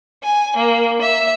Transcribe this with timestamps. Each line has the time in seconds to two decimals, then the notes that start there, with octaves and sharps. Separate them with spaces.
0.22 G#5
0.57 A#3
1.01 E5